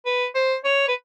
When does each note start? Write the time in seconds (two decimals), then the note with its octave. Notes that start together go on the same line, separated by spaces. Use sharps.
0.06 B4
0.35 C5
0.64 C#5
0.88 B4